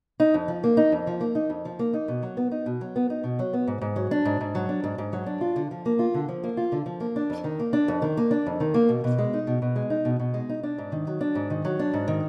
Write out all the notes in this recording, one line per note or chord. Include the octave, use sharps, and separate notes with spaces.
D#4
F2
F3
A#3
D#4
F2
F3
A#3
D#4
F2
F3
A#3
D#4
B2
F#3
B3
D#4
B2
F#3
B3
D#4
B2
F#3
B3
G#2
G#2
F#3
D4
G#2
G#2
F#3
D4
G#2
G#2
F#3
D4
F4
D3
F3
A#3
F4
D3
F3
A#3
F4
D3
F3
A#3
D4
F2
D#3
A#3
D4
F2
D#3
A#3
D4
F2
D#3
A#3
B2
B2
G#3
D#4
B2
B2
G#3
D#4
B2
B2
G#3
D#4
D4
G#2
D#3
F#3
D4
G#2
D#3
F#3
D4
G#2
D#3